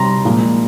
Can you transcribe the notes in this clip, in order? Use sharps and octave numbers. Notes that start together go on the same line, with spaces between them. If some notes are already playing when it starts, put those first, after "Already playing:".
Already playing: C3 G3 A#5 C6
A#2 F3 G#3